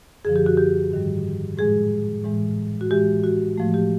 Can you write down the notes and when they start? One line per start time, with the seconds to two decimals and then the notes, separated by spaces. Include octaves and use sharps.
0.25 F#2 D3 F3 G#4
0.36 G4
0.46 F#4
0.57 G4
0.91 G#2 D#3 G3
1.57 A2 F3 G#3 G#4
2.24 A2 E3 G#3
2.81 F#4
2.91 A2 E3 G#3 G4
3.24 F#4
3.57 A2 F3 A3
3.74 G4